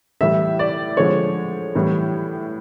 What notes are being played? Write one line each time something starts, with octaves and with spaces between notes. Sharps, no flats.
A2 E3 G3 E5
D5
D3 F3 G#3 C#5
A2 E3 G3